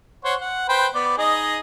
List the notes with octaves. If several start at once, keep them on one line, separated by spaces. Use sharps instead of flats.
C5 C#5 F#5
F#5
B4 C5 G5
B3 D5
D#4 G#4 D#5